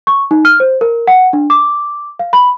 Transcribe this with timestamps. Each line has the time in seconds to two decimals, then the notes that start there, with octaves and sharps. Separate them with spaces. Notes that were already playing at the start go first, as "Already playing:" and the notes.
0.07 C#6
0.31 D#4
0.45 F6
0.60 C5
0.81 A#4
1.07 F#5
1.33 D4
1.50 D6
2.19 F5
2.33 B5